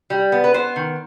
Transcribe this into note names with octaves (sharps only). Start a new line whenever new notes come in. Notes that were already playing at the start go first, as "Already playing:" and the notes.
G3
B3
B4
B3 C5
D#3